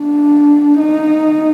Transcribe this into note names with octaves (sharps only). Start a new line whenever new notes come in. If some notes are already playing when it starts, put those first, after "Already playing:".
Already playing: D4
D#4